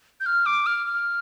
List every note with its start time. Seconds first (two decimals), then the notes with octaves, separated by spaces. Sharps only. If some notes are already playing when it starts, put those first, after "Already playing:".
0.20 G6
0.26 F6
0.46 D6
0.66 F6
0.86 F6